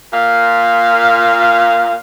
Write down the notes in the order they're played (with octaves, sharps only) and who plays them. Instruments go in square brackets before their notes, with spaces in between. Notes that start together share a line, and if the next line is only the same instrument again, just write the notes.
[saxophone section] A#2 F5